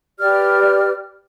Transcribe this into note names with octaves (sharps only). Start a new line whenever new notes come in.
G4 B4 D5 F6